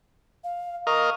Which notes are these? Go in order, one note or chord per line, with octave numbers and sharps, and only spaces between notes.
F5
A#4 D#5 F5 C#6